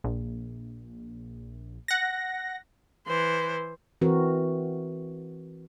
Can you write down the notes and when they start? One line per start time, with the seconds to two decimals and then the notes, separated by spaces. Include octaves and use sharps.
0.04 A#1
1.88 F#5 A#6
3.07 E3 C5
4.01 E3 C4 F#4 A#4